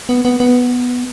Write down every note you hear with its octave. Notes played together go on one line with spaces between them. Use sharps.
B3
B3
B3